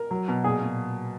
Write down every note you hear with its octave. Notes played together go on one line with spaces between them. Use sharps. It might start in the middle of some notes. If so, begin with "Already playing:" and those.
Already playing: A#4
F#3
B2
A#2 G#4
A#2